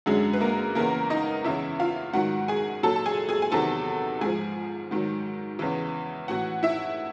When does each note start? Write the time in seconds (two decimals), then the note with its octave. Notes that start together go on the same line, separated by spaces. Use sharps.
0.06 F#2 D3 F#3 G#3 G#4
0.33 B4
0.41 A#3 A#4
0.75 E2 C#3 E3 A#3 A#4
1.10 D#4 D#5
1.44 E2 C#3 E3 E4 E5
1.80 F4 F5
2.13 G#2 D#3 F#3 F#4 F#5
2.48 G#4 G#5
2.83 A#2 F#3 A4 A5
2.96 A5
3.06 G#4 G#5
3.29 G#4 G#5
3.42 G#5
3.52 E2 C3 D#3 F#3 A4 A5
4.21 G#2 F3 G#4 G#5
4.91 G#2 D#3 F#3
5.59 E2 C#3 E3
6.28 A2 E3 F#4 F#5
6.63 E4 E5